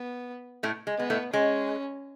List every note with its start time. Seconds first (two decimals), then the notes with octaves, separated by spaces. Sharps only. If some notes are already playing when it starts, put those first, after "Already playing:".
Already playing: B3
0.63 A2 A3
0.87 G#3
0.98 G#3 B3
1.10 A2 A3
1.33 G#3 C#4